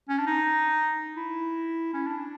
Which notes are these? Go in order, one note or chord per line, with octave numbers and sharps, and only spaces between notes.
C#4
D4
D#4
E4
C#4
D4